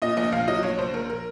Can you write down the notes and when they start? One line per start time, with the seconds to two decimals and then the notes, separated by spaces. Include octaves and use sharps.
0.02 A#2 D#5
0.17 A#1 D#5
0.32 A#1 F5
0.48 F#3 D#5
0.63 A#1 C#5
0.78 A#1 C5
0.94 A#1 A#4
1.09 A#4